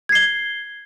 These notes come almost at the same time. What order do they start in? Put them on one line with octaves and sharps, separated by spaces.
G#6 C7 G7